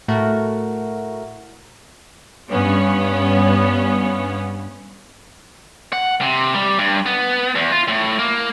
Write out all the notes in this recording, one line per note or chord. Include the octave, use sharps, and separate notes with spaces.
A2 A3 F#4 A#4
G2 B3 C#4
F#5
C3
G3
G2
B3
E2
F4
A2
A#3